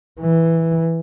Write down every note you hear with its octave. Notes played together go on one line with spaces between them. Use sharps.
E3